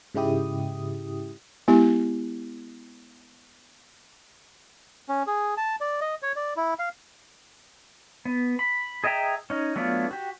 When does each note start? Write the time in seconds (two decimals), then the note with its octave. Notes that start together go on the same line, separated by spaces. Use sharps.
0.14 G#2 C#3 G#3 E4 G4 D#6
1.68 G#3 B3 E4 G4
5.09 C#4
5.27 G#4
5.57 A5
5.81 D5
6.01 D#5
6.22 C#5
6.36 D5
6.56 E4
6.79 F5
8.25 B3
8.59 B5
9.04 G#4 D#5 E5 G5 A#5
9.50 C#4 D#4
9.76 F#3 A3 B3 D4 F4
10.11 F#4 G4